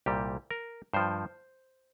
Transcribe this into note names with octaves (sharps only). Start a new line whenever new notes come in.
C2 A#2 G3 G4
A#4
G2 F3 C5